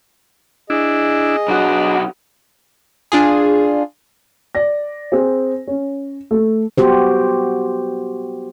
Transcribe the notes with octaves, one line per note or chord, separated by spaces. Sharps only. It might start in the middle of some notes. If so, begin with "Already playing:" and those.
D4 E4 G#4 D#5
B1 D4 F#4
D4 F4 G#4
D5 A#6
C4 G#4
C#4
A3 A4
B3 F#4 G4 C5